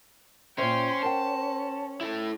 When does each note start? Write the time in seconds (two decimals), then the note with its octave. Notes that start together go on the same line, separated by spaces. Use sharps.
0.58 A#2 C#4 C5 E5 G5 C6
1.03 C#4 A#4 F#5 G5 A5
2.01 E4 A4